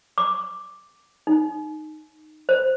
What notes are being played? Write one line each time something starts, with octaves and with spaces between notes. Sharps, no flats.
D6
D#4
C5